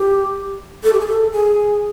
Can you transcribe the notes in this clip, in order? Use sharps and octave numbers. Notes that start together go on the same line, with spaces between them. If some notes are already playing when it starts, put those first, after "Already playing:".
Already playing: G4
A4
G4
G#4
A4
G#4